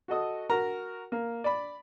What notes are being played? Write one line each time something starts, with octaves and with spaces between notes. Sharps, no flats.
F#4 A4 D#5 D#6
F#4 A#4 A#5
A#3
D5 B5